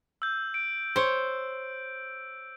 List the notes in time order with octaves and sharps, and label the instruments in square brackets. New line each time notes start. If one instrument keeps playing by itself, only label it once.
[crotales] E6 G6
D7
[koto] C5 C#5